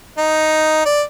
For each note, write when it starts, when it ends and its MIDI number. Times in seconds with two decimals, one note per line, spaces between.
0.18 0.85 63
0.86 1.02 74